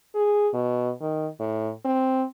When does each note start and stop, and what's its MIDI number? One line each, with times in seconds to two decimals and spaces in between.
0.15 0.48 68
0.54 0.90 47
1.01 1.27 51
1.40 1.71 45
1.85 2.24 60